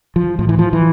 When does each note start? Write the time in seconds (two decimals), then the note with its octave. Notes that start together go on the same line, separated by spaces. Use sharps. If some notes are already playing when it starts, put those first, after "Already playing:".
0.16 F3
0.39 A2 F3
0.49 E3
0.59 F3
0.73 E3